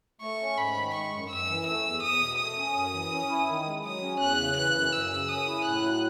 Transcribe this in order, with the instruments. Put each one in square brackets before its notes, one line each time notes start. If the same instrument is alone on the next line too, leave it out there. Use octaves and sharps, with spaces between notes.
[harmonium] A3 [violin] C#6
[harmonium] C#4
[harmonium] G#2 [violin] B5
[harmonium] D#3
[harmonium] G#3 [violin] C#6
[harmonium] F#2
[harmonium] F#2 [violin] E6
[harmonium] E3
[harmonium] A3 [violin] E6
[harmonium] E2
[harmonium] E2 [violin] D#6
[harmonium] B2
[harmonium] A3 [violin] D#6
[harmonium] C#4
F#2
E3
C#4
E4
D#3
G#3
[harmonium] F#3 [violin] D#6
[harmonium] C#4
[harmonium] E2 [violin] F#6
[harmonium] C#3
[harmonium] E3 [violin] F#6
[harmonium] F#2
[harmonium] F#2 [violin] E6
[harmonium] C#3
[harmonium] C#4 [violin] D#6
[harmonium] E4
[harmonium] A2 [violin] F#6
[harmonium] F#3